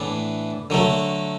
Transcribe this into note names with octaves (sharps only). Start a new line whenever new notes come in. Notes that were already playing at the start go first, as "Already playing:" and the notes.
Already playing: A2 E3 B3 D4
D3 F#3 A3